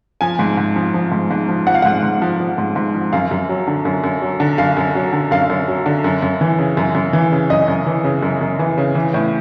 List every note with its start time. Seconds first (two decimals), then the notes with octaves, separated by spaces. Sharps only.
0.21 F3 G#5
0.39 G#2
0.57 G#2
0.76 F3
0.94 F3
1.12 G#2
1.31 G#2
1.49 F3
1.67 F3 F#5
1.75 F5
1.82 G#2 F#5
2.03 G#2
2.22 F3
2.40 F3
2.58 G#2
2.76 G#2
2.95 F3
3.13 F#2 F5
3.31 F#2
3.49 F#3
3.67 D3
3.85 F#2
4.04 F#2
4.22 F#3
4.40 D3
4.58 F#2 F5
4.77 F#2
4.95 F#3
5.13 D3
5.31 F#2 F5
5.50 F#2
5.68 F#3
5.86 D3
6.04 F#2
6.22 F#2
6.41 E3
6.59 C#3
6.77 F#2
6.95 F#2
7.13 E3
7.32 C#3
7.50 F#2 D#5
7.68 F#2
7.86 E3
8.04 C#3
8.23 F#2
8.41 F#2
8.59 E3
8.78 C#3
8.95 E3
9.14 A2